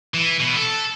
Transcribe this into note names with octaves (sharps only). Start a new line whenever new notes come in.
E3
B2
A4